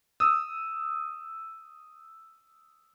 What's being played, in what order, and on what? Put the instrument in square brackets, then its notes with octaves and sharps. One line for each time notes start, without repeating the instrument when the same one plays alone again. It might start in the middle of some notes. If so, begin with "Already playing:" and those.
[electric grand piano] D#6 E6